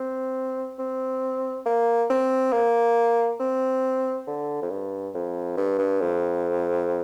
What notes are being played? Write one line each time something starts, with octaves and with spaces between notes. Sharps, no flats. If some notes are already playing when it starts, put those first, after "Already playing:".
Already playing: C4
C4
A#3
C4
A#3
C4
D3
F2
G2
F2
G2
G2
F2